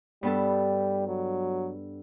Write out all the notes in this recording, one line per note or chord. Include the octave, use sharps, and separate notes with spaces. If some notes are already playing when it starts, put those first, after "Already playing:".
G2 G3 B3 A4
F#3